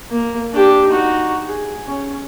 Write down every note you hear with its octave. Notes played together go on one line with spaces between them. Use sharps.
A#3
D4 G4
D#4 F#4
G#4
C#4